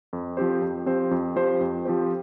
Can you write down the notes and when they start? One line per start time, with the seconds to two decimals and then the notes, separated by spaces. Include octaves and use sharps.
0.13 F2
0.37 F3 C4 G4 C5
0.61 F2
0.86 F3 C4 G4 C5
1.11 F2
1.36 F3 C4 G4 C5
1.60 F2
1.85 F3 C4 G4 C5